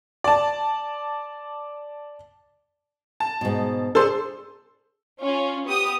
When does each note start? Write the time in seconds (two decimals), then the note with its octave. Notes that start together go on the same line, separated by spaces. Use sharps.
0.24 D5 A5
3.20 A5
3.41 G#2 B2
3.95 D4 G#4 A4 C5 C6
5.21 C#4 F4
5.67 B3 G4 D#6